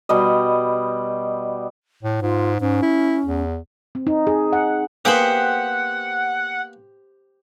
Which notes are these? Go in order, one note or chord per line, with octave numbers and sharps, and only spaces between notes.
B2 G3 D#5
A2
G#2 F4
G#2 C#4
E4
E2
C4
D#4
G#4
F#5
A#3 B3 G4 G#4 C5 F#5